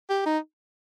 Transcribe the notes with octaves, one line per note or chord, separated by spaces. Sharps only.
G4
D#4